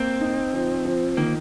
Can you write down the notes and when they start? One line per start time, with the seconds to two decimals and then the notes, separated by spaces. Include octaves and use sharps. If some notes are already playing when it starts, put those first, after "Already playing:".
Already playing: A#3 C4
0.20 D#4
0.53 F3
0.85 F3
1.17 D#3 A#3